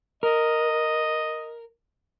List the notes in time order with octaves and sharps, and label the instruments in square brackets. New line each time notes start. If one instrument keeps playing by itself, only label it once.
[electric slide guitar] A#4 [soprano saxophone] D#5